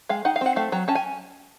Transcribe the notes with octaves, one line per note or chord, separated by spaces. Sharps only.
G#3 F5
D#4 F#5
F5
C4 F#5
A3 F5
F#3 A#5
C#4 A5
G#5